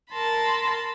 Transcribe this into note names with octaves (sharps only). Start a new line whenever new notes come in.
A#4 A5 B5 C6